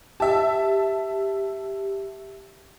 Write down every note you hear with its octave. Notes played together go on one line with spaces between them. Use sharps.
G4 E5 A5